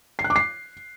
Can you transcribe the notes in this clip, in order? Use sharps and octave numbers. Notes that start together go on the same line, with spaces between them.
C7
F#6
D6
C7